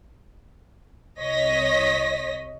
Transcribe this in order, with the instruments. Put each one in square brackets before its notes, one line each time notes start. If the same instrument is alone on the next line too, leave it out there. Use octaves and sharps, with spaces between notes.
[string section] C2 C#5 D#5 A#6 B6